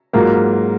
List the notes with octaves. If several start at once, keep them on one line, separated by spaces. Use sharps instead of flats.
G#2 F#3 A#3 F4 A#4